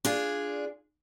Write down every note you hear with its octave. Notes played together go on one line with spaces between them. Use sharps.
D4 F4 G#4